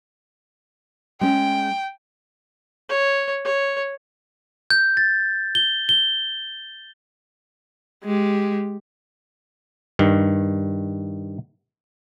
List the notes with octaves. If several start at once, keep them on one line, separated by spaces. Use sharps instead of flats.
G#3 C#4 G5
C#5
C#5
G6
A6
G7
G7
G#3 G4
G2 D#3